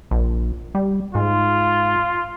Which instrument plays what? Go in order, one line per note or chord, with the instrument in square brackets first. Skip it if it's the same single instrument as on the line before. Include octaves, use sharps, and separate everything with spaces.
[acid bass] A#1
G3
[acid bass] G#2 [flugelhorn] F4